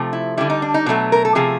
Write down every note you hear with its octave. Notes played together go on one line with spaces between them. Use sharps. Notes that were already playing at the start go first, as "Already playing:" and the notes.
Already playing: C3 F3 A3
E4
D3 G3 E4
D#4
D4
D#4
B2 F#3 A3
A#4
A4
C3 F3 A3 G#4